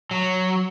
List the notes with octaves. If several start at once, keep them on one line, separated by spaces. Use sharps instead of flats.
F#3